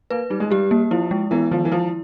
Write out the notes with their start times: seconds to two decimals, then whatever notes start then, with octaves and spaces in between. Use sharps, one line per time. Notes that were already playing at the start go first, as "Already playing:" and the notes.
0.10 A#3 B4
0.30 G3 D#4
0.40 G#3
0.51 G3 G4
0.71 A#3
0.91 F3 E4
1.11 G#3
1.31 E3 B3
1.51 D#3 F3
1.65 E3
1.72 F3 E4